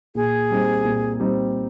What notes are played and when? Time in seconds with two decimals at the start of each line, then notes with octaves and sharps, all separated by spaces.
0.15 A#2 G#4
0.51 G3 C4 D#4
0.85 A#2
1.20 G3 C4 D#4